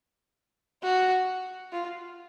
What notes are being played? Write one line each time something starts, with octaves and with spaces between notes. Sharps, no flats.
F#4
F4